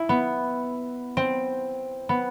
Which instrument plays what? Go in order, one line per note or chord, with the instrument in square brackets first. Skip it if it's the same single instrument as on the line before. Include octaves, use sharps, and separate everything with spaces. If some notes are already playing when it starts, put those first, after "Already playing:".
Already playing: [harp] E4
B3
C4
B3